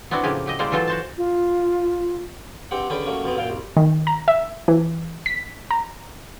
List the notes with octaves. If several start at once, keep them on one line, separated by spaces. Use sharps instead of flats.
B3 C4 D4 E4 F#4
A2 C#3 F3 A#3 G4 G#4
F#3 G4 D#5
G3 G#3 A#3 E4 C5 D5
E3 F#3 F4 A4 C5
F#4 C5 A5
F4
G2 C4 G4 F#5
D3 C#4 G4 G#4 B4 D5
F#3 A3 A#3 C#4
F2 B2 B3 C4
F#2 A#2 F5 G5
C2
D#3
A#5
E5
E3
B6
A#5